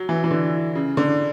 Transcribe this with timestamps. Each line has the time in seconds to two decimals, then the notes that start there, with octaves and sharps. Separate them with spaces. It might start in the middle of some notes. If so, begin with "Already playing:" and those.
Already playing: F#3
0.09 E3
0.24 E3
0.31 D3
0.75 C#3
0.97 D3